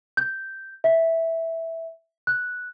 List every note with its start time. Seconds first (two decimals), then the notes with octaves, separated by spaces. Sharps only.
0.17 G6
0.84 E5
2.27 F#6